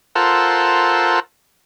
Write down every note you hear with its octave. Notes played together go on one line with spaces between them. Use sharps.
F4 A4 A#4 C5 F#5 E6